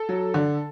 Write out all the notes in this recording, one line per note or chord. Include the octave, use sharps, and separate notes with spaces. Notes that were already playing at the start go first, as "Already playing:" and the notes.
Already playing: A4
F#3
D3